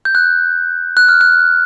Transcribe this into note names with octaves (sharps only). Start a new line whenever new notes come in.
G6
F#6
F#6
F6
F#6